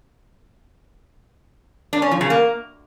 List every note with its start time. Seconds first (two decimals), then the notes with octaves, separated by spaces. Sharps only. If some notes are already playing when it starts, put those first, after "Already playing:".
1.93 D4
2.02 C#4
2.11 F3
2.21 C#3
2.30 A#3